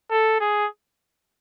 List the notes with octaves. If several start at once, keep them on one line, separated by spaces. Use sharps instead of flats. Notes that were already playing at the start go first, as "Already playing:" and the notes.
A4
G#4